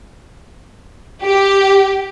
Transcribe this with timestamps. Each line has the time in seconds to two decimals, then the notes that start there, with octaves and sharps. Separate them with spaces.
1.22 G4